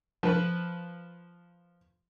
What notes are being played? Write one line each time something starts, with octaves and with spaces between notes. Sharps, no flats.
F3 B4